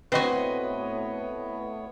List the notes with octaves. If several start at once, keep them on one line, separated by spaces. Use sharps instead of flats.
A2 B3 C4 F#4 B4 C#5 D#5